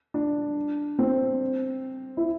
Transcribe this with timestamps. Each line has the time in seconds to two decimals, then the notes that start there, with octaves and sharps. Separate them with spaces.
0.14 D4
0.99 C4
2.17 E4